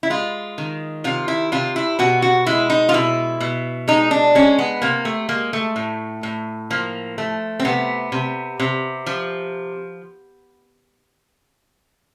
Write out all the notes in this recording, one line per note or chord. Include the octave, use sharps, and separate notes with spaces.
E4
G#3 F4
D#3
C3 F4
E4
C3 F4
E4
B2 F#4
F#4
G#3 E4
D#4
F4
B2 E4
B2
G#3 D#4
D4
G#3 C#4
B3
C3 A#3
A3
G#3 A#3
A3
A2
A2
F3 A#3
A3
C4
C3 B3
C3
C3
F3